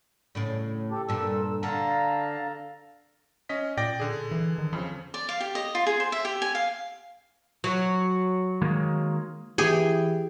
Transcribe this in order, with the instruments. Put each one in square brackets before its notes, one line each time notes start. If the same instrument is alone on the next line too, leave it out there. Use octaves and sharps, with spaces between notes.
[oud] A2 C#3 D5
[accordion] G4 A4
[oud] G2 A#2 [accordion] A4 E6
[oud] D3 [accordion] F5 A5 A#5
[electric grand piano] C#4 D#5 B6
[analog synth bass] A#2 [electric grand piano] D5 G5 A#6
[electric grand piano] D3 G#4
[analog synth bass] E3
D#3
[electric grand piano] F2 C#3 [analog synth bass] F3
[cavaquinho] D5
F5
G4
D#5
F4
G#4
C5
E5
G4
G#5
F5
[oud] F#3
[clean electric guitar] D#3 G#3 A#3
[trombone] E3 [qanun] G4 [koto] G#4